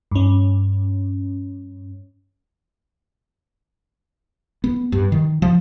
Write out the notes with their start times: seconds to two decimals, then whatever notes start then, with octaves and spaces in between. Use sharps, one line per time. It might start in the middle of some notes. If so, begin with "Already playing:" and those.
0.12 G2 C#4
4.64 B3
4.92 G2
5.12 D#3
5.42 F3